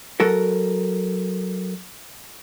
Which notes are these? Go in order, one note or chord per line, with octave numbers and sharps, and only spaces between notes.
F#3 F#4 A4 A#4